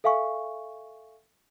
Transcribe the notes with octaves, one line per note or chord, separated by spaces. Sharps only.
A4 E5 F5 G#5 C#6